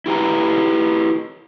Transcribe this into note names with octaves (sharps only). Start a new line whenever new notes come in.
E4 G4 B4 A#5